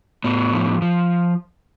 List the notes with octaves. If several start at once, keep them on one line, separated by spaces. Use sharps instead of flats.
A2 B3
F3
F3